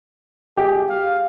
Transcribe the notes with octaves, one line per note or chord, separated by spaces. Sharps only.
G4 G#4
F5